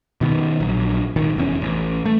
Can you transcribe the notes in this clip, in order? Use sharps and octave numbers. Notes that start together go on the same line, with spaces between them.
B2 D#3 B3
A#1 F#3
D#1 G#1 D#3
F1 E2 C#4
A1
A3